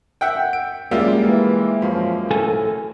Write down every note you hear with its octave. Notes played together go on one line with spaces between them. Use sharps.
E5 F#5 G5
D7
F#2 G3 G#3 A#3 F4 E5
E3
F#2 F3
A2 A4 A#4 G#5